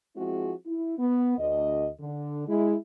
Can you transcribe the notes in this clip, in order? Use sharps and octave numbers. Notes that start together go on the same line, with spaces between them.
F3 G#3 C4 E4 F#4 G#4
E4
B3
D2 D#5
D3
G#3 E4